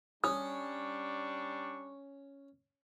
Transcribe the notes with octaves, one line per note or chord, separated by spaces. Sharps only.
G3 C#4 D4 C#6 D#6